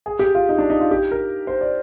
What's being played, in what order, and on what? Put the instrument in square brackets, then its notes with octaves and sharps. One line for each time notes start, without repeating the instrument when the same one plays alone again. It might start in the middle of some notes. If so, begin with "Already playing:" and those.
[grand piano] G#4
G4
F4
D#4
D4
D#4
F4
G4
A#4
C5
D5